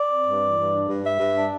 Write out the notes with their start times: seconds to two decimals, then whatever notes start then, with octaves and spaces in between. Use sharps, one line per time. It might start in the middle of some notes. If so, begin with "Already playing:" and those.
Already playing: D5
0.10 C4
0.26 G2
0.41 E3
0.57 G2
0.72 D4
0.88 G2
1.04 G3 E5
1.19 G2
1.35 D4